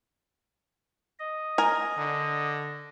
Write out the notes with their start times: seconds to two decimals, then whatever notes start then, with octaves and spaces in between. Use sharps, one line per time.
1.19 D#5
1.58 A#4 G#5
1.97 D3